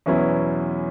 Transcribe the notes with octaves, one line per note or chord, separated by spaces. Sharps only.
E2 B2 F#3 C#4 E4